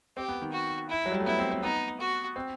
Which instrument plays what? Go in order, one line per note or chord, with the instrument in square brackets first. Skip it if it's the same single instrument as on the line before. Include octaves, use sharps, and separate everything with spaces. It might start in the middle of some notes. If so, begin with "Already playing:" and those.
[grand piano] C4 [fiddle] G4
[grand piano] B3
D#3
[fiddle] F#4
E4
[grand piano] F#3
G3
A3
[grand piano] B3 [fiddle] E4
[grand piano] C4
C4
[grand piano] B3 [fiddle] D#4
[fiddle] F#4
[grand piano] C4